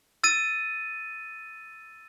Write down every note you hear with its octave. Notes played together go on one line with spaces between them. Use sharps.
E6 A6 D#7